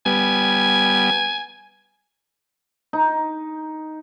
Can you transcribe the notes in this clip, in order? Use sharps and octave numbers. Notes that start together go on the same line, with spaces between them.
G3 B3 G#5
D#4